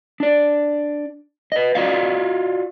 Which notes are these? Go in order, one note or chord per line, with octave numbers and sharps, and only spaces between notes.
D4 D5
B4 D#5
F4 F#4 D5 D#5 F5